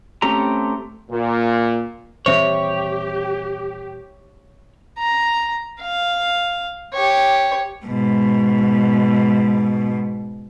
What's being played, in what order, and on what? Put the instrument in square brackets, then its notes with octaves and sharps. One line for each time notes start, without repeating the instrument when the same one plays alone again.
[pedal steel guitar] A3 C4 C#4 G4 A#5
[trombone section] A#2
[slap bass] D#1 E3 C4 [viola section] G4 [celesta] C5 E5 [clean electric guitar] C#5
[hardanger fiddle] A#5
F5
G4 C#5
[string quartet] G#2 B2